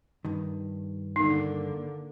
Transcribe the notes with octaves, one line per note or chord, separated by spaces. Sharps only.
G2 D#3
D3 A#3 D#4